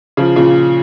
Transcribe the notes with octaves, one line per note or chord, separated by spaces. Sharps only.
C#3 F3
A#2 C#3